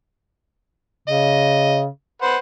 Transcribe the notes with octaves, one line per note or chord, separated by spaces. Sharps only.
C#3 D#5
B4 C5 F#5